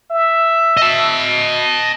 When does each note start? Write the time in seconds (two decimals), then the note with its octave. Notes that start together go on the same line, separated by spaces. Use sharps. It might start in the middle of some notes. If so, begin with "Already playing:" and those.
0.11 E5
0.77 D#5 A5